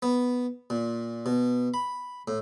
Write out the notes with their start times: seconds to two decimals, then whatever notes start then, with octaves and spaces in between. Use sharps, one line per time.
0.02 B3
0.70 A#2
1.26 B2
1.74 B5
2.28 A2